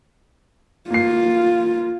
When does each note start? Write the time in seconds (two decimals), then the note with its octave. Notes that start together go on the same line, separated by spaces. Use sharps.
0.90 A#3 F4 C7